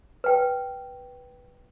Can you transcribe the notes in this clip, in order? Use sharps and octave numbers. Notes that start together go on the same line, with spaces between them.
B4 G5